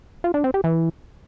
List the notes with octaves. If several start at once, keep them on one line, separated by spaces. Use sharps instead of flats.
F4
D4
C4
G4
E3